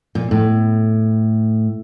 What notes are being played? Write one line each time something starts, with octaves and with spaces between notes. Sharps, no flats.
A#2
A2